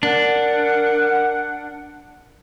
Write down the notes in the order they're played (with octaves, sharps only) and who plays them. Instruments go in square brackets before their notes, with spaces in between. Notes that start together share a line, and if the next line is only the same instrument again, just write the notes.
[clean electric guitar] D4 [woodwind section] A#4 F#5